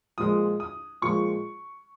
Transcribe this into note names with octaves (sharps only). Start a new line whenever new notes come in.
A#2 F3 G#3 D#6
D#6
A#2 F3 G#3 C#6